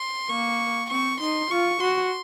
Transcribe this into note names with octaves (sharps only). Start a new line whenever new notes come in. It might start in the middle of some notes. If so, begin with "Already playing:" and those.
Already playing: C6
A#3 C#6
C4 C#6
D#4 C6
F4 C#6
F#4 C6